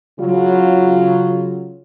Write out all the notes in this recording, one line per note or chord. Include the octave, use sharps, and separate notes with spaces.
C#3 F#3 F4